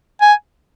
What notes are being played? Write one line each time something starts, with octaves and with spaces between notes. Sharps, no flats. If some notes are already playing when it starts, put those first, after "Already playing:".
G#5